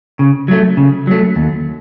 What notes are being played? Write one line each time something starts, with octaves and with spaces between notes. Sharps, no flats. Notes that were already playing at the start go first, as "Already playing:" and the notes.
C#3
F#3 A3
C#3
F#3 A3
D#2